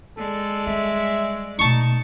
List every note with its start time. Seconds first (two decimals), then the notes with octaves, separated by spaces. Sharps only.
0.18 G#3 A4 D5
0.67 G3 E5
1.59 B2 A3 D#4 A5 C#6